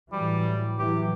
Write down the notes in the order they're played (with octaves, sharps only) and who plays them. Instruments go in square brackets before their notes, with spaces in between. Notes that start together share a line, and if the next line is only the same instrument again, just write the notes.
[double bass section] A2 E3 F#3 [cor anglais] G3
[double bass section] A2 E3 F#3 [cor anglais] G4